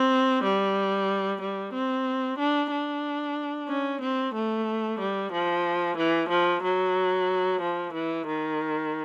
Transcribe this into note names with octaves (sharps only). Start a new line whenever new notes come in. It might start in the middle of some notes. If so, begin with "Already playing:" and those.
Already playing: C4
G3
G3
C4
D4
D4
C#4
C4
A3
G3
F3
E3
F3
F#3
F3
E3
D#3